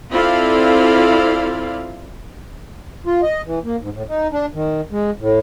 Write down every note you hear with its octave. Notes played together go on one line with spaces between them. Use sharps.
C4 E4 F4 A4 D5 F5
F4
D#5
E3
A#3
G#2
A2
D#4
D4
D#3
G#3
A2